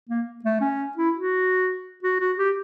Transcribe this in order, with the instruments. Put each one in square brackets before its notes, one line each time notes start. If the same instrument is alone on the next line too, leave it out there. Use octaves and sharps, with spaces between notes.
[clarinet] A#3
A3
C#4
E4
F#4
F#4
F#4
G4